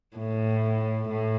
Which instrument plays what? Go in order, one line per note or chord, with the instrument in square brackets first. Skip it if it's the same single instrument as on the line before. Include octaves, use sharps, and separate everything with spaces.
[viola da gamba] A2
A2